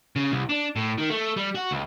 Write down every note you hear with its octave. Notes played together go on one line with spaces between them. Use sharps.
C#3
C2
D4
A2
D#3
A3
G3
F#4
C#2